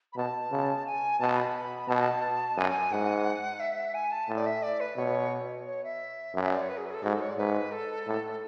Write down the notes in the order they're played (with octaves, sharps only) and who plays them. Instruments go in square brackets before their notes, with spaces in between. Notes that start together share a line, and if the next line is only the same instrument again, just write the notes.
[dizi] B5
[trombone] B2 [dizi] A5
[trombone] C#3
[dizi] G#5
[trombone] B2 [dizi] A5
[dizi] B5
[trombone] B2 [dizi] A5
[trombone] F#2 [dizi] G#5
[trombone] G#2 [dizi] F#5
[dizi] E5
G#5
A5
[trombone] A2
[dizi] D5
E5
D5
B4
[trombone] B2 [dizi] C#5
[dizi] C#5
E5
[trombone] F#2
[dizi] E5
D5
C#5
B4
G#4
B4
G#4
A4
[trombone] G#2 [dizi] F#4
[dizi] A4
C#5
D5
[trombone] G#2 [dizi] B4
[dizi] A4
[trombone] A2